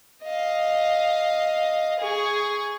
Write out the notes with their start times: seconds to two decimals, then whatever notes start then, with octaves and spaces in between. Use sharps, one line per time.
0.23 D#5 F5
1.99 G#4 C#6